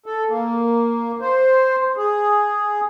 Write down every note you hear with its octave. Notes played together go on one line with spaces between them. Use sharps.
A4
A#3
C5
G#4